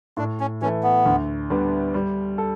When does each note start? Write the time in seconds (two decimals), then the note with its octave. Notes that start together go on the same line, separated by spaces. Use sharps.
0.17 A2 D4
0.40 C#4
0.62 E3 C#4
0.65 A3
0.83 B3
1.06 D2
1.50 D3 G3 B3
1.94 G3
2.38 A4